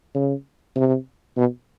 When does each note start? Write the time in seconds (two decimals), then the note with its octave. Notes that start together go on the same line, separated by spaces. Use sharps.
0.15 C#3
0.76 C3
1.37 B2